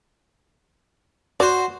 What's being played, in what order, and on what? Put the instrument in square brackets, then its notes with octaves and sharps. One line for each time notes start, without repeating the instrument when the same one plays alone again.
[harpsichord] F#4 C5 [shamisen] D5